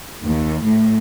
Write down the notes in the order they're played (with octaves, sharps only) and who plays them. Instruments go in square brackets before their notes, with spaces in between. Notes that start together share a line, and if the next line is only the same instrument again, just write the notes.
[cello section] D#2
A2